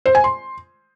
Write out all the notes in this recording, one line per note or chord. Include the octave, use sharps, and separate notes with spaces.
C5
G#5
C6